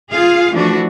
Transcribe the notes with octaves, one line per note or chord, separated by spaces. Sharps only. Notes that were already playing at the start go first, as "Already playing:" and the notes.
F4 G#4 F5
E3 F3 A3 D4 F#4